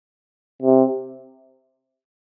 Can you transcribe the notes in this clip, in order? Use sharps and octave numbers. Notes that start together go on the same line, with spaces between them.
C3